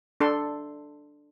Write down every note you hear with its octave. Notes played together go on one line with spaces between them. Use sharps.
D4 A4 C6